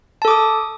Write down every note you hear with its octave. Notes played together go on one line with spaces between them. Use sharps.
A4 A5 D6 D#6